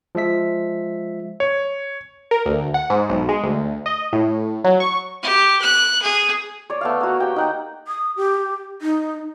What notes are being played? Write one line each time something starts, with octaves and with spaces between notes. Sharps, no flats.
F3 G#3 E5 B6
C#5
A#4
D2
F#5
G#2
B1
G#3
D2
D#5
A2
F#3
C#6
G4
F#6
G#4
C#5 D5
A3 B3 F5
A#3 F#4
G4 G5
D#4 F#5 G5
D#6
G4
D#4